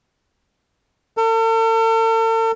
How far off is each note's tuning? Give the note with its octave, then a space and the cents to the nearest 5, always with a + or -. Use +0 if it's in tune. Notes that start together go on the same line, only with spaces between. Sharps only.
A4 +45